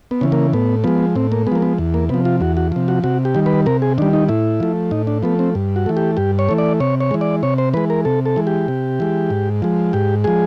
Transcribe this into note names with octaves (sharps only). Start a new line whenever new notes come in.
B3
C#3 E3
A#3
A2 B3
F3 G#3 B3
A2 C4
A#3
G#3 B3
F3 A#3
B3
E2
A#3
C3 F3 B3
F4
E2 F#4
F#4
C3 F3
F#4
C3 F#4
G4
D#3 G3
B4
C3 A#4
G#4
D#3 G3 D4
D#4
A2 E4
F3 A3
A2 D#4
D4
F3 A3 B3
C4
G2
F#4
E3 A3
G4
G2 G4
C#5
E3 A3
D5
C3 C#5
C#5
E3 G#3
D5
C3 C#5
C5
E3 G#3 B4
A#4
C3 A4
A4
E3 G#3
G4
C3
E3 G#3
G#2
F3 G#3
G#2 G4
F3 G#3 G#4